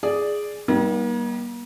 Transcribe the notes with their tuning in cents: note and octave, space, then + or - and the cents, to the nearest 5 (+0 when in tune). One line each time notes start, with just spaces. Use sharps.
G#4 +0 D5 +0
G3 -20 A#3 +40 D#4 +5